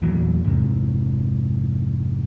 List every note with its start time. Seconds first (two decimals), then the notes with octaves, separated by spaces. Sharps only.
0.02 E2 A#2 E3 F#3
0.44 F2 G#2 C3